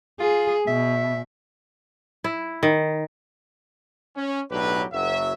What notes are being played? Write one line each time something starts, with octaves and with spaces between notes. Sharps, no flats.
F4 G#4
B2 E5
E4
D#3
C#4
B1 A2 F#3 D4 G4 B4
F#1 F#3 E5